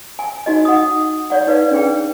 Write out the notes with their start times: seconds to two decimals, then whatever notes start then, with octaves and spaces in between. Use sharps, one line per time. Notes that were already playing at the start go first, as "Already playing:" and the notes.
0.19 G#5
0.46 D#4 F#4 D#5
0.65 F#5 D#6
1.30 C#5 D5 F#5
1.47 D#4 B4 D5 F5
1.71 C#4 D4 G#4 B4 G5